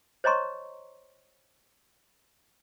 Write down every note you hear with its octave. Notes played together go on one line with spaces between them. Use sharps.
C5 C#5 D#5 A#5 C6 C#6